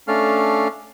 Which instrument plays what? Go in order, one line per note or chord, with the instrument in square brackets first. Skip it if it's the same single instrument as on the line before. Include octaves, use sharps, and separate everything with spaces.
[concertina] A3 C#4 D4 A4 F5 F6